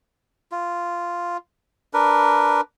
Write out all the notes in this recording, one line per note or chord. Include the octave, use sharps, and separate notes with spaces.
F4
D4 A#4 B4